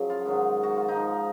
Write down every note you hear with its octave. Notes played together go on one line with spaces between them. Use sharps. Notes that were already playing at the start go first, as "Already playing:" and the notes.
Already playing: F#2 C#3 F3
F4
G#2 D#3 F#3
F#4
F4
G#2 F3 D#4